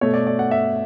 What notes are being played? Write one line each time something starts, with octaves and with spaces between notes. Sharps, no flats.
B2 A3 C#5
D5
D5
F#5
E5